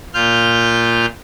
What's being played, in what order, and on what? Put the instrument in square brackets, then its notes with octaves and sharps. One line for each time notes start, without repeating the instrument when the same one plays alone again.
[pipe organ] A#2 F4 F6 G6